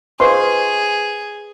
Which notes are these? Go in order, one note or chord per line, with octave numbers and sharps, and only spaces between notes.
G#4 B4 C5 D#5 C6 C#6